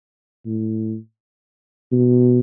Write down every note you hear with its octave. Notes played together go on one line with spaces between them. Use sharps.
A2
B2